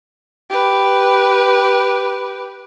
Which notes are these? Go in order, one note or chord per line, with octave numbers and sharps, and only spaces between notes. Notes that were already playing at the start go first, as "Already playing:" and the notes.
G4 B4